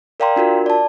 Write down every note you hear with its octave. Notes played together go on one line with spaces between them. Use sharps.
A#4 D5 F5 G5 A#5 C6
D4 F4 F#4 A#4
D5 A5